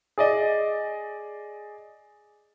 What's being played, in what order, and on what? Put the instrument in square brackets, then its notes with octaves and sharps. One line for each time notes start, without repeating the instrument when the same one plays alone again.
[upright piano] G#4 D5 D#5